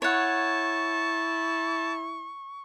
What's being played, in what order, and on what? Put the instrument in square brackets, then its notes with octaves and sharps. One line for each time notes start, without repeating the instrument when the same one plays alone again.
[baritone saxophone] E4 [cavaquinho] C#5 F#5 [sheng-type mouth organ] A5 [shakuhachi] C#6